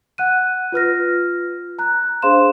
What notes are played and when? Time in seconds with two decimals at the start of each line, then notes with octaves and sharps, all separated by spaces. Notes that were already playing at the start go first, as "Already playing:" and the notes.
0.18 F#5 F#6 D#7
0.72 F4 B4 F6 A#6
1.79 A#5 F#6
2.22 D4 G#4 C5 F5 C6 E7